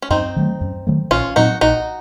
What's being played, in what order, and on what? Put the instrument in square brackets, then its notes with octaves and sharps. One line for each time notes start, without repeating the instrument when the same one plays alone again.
[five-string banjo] C#4
[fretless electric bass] F#2 [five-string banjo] C4 D#4
[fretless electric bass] D#3 F#3 A3
F#2
D#3 F#3 A3
[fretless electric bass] A#1 [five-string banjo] C#4 F4
[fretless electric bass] A#2 F#3 C4 [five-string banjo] D#4 F#4
[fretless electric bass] A#1 [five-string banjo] D#4 F#4